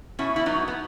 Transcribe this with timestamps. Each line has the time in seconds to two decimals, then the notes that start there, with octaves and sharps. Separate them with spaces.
0.19 B2 C#4 E4
0.36 E4
0.46 F#3 B3 D#4
0.68 B3